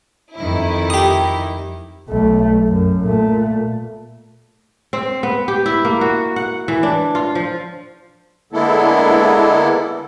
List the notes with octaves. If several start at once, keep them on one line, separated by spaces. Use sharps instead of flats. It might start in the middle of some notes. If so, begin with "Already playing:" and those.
F2 D#3 E4
G4 D#6
B1 A3
F#2
A#2 A3
C4
B3
G4
E4
A#3
F#4
F#5
E3
D4
F4
F3
D3 G#3 A#3 B3 E4 A4